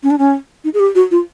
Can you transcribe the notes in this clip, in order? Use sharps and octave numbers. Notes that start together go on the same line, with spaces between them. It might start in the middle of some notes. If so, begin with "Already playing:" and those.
C#4
D4
C#4
D#4
G#4
G4
F#4
F4